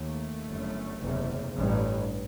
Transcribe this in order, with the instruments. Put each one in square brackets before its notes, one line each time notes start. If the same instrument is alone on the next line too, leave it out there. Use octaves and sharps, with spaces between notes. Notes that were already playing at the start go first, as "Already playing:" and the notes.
Already playing: [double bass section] D#2 A3
G1 F#2
F#1 E2 C3
A1 G2